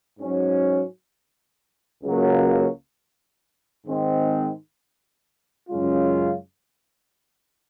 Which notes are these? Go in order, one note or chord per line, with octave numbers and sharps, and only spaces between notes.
G#2 F#3 C#4 F#4
C#2 C#3 F#3 A#3
G#2 D#3 G#3 C4
F#2 C#3 G#3 C#4 F4